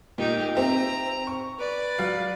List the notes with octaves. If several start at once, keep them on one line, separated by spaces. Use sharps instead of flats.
A#2 D#4 G4
C4 G4 E5 A#5
C#6
B4 D5
F#3 F5